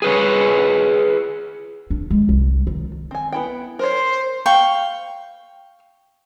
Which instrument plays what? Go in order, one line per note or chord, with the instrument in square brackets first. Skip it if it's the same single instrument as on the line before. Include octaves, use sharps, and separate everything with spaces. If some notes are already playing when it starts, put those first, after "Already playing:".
[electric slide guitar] G#4 B4 C#5
[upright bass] D4
G#3
C2
D#3
[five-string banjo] C4 G#5
B3 E4 G5
[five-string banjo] A#4 C#5 [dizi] C5
[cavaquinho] F5 G5 C#6